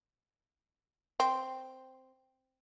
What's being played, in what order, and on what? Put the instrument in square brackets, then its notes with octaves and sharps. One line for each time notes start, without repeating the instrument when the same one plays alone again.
[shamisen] C4